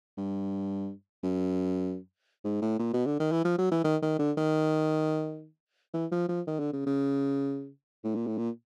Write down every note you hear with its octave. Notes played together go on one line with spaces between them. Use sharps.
G2
F#2
G#2
A2
A#2
B2
D3
D#3
E3
F3
F#3
E3
D#3
D#3
D3
D#3
E3
F3
F3
D#3
D3
C#3
C#3
A2
A#2
A2
A#2